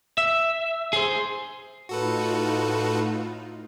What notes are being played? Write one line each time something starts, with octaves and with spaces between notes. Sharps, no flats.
E5
G#4 C5
A2 D#4 F4 F#4 A4 B4